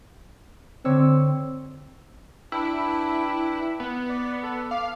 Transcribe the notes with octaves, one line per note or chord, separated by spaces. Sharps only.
D3 C4 C#5 E6
D4 E4 B4 G5
B3
D5
A4
F5 D6